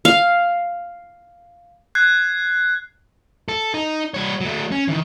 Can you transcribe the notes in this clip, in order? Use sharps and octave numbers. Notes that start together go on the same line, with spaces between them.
F5
F#6 G#6 C7
A4
D#4
G3 C#5
F#3 A3
C#4
D#3 E3